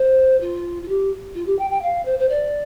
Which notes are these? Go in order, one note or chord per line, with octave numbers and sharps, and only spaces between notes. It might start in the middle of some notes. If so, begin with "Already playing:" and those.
Already playing: C5
F4
F4
G4
F4
G4
G5
G5
F5
C5
C5
D5